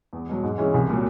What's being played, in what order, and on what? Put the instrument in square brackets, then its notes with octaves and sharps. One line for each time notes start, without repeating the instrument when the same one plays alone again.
[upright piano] E2
B2 F#3
G#2
E3 G#3 C#4
C2
A#2 F#3